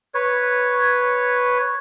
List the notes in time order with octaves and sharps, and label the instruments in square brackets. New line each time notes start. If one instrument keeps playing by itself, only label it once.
[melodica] B4 C#5